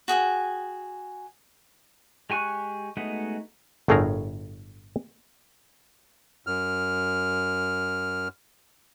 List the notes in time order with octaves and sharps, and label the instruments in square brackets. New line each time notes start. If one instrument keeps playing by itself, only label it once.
[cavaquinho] F#4 G#4 G5 G#5
[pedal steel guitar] G#3 G4 G#5 C#6 F#6
G#3 A3 B3 D#4 F#4
[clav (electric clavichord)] G1 A2 A3 G#4 A#4 A#5
[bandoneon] F#2 F6